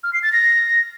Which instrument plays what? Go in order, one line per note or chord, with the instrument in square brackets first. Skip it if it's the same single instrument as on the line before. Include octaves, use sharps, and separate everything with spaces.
[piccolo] F6
C7
A6
A#6